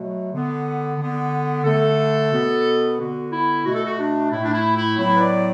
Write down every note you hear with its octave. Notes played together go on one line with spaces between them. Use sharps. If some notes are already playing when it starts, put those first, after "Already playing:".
Already playing: B2 F#3 A3
D3 B3
D3 B3
D3 A3 A4
B2 B3
D3 B3 F#4
E4
B2 A3 F#4
A4
F#4
D4
A2 A3 E4
D4
E4
E4
A2 F#3 B3 E4
B4
D5